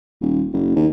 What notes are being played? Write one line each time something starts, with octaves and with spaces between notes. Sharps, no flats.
D#1
F#1
D#2